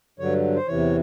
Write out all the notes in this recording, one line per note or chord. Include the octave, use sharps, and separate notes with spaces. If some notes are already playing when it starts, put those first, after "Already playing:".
G2 D3 F#3 C#5
C5
E2 C3 E3 C#5